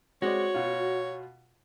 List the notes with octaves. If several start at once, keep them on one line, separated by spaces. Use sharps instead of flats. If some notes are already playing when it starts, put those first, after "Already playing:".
G#3 C4 F#4 C#5 D5
B2 F4